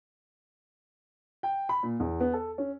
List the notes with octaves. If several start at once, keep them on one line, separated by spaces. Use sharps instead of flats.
G5
B5
A#2
E2
B3
A4
C#4